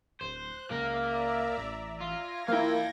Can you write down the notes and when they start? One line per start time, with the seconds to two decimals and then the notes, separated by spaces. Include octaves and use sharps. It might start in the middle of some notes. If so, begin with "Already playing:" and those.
0.21 D1 C5 F#6
0.71 C#2 A#3 A#4 D5 E5 A#5
1.58 A1
2.00 F4 G#6 A#6
2.48 A#3 E4 F4 F5 G5